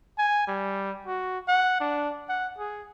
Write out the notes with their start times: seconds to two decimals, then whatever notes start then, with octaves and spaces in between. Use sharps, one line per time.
0.18 G#5
0.47 G3
1.07 F#4
1.48 F#5
1.80 D4
2.29 F#5
2.58 G#4